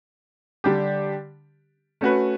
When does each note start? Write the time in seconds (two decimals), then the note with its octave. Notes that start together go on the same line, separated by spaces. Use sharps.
0.64 D3 G3 D4 G4
2.01 A3 C#4 F#4 B4